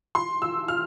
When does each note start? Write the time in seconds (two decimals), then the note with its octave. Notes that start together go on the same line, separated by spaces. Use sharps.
0.15 C6
0.42 E6
0.68 F6